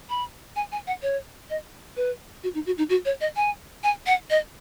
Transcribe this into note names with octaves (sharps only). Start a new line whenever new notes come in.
B5
G#5
G#5
F#5
C#5
D#5
B4
F#4
D#4
F#4
D#4
F#4
C#5
D#5
G#5
G#5
F#5
D#5